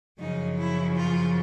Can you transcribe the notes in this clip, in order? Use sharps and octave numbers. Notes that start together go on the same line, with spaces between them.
F#2 C#3 F3 D#4
E4
F4